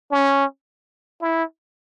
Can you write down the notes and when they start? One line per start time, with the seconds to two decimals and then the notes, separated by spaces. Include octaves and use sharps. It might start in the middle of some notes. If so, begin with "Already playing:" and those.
0.11 C#4
1.21 E4